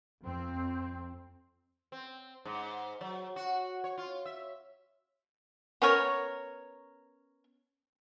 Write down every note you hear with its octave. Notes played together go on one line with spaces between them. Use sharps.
F2 C4
C4
G#2
F#3
F#4
C#5
F4
E5
B3 C#4 A#4 C#5